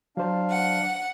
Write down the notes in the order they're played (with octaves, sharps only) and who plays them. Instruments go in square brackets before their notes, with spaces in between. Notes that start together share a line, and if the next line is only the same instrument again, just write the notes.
[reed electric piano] F#3 C5 [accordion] D4 F5
[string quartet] F#5